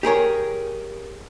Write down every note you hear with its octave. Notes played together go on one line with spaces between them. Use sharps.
G4 G#4 A#4 C#5